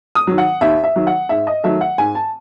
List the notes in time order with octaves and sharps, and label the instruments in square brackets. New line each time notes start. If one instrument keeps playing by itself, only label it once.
[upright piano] D#6
D#3 F#3
F#5
D#2 E5
E5
D#3 F#3
F#5
G#2 E5
D#5
D#3 F#3 A3 E5
F#5
G#2 G#5
A5